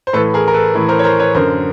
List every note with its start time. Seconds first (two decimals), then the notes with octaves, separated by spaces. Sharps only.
0.07 C5
0.13 A2 A4 B4
0.17 E3
0.34 G#4 A#4
0.48 A#4
0.54 A4 B4
0.75 A2 E3
0.89 A#4 C5
0.99 C#5
1.04 A#4 C5
1.19 B4 C#5
1.35 F#2 D3 A#4 C5